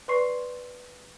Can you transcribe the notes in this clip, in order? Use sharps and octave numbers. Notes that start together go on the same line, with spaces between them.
B4 D5 C6 C#6 C7